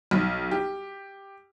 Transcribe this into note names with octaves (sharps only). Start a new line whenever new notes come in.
B1
G4